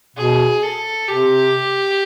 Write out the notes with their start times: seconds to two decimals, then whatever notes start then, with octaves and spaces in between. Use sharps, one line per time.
0.16 B2 G#4
0.63 A4
1.08 C3 G4